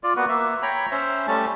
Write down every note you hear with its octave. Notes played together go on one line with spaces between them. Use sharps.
F4 D5
A#3 B3 F#4 B4
A#3 E5
C#5 G5 A#5 B5
C#4 C5 E5
G3 A3 C#4 A5